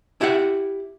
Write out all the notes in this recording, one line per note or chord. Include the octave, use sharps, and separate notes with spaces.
E4 G4 E5 F#5